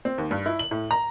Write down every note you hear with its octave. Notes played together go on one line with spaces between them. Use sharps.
C4
D#2
G2
E4
F#7
A2
A#5